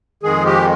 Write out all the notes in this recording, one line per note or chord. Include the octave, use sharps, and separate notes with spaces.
F2 D#3 G#3 G#4
G4